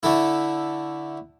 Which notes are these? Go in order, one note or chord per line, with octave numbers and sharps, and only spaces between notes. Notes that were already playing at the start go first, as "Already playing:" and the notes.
D3 A3 E4